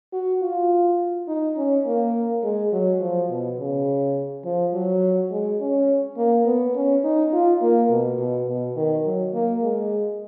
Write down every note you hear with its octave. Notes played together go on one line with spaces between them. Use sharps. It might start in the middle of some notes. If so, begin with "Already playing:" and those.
F#4
F4
D#4
C#4
A#3
G#3
F#3
F3
B2
C#3
F3
F#3
G#3
C#4
A#3
B3
C#4
D#4
F4
A#3
B2
B2
B2
D#3
F#3
A#3
G#3